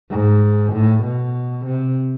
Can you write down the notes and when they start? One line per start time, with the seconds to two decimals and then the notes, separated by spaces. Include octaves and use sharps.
0.10 G#2
0.73 A2
1.04 B2
1.66 C3